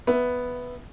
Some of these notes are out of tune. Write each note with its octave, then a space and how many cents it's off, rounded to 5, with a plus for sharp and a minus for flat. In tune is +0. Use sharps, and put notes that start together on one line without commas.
B3 +0 E5 +0